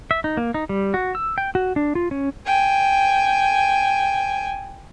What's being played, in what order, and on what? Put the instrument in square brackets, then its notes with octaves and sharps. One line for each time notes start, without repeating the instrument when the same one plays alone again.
[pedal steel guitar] E5
D#4
A#3
D#4
G3
F#4
E6
G5
F#4
D4
F4
C#4
[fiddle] G5 G#5